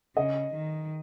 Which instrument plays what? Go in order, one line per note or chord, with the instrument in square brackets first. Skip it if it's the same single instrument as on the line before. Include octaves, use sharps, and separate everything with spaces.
[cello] C#3 [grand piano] D#5
[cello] D#3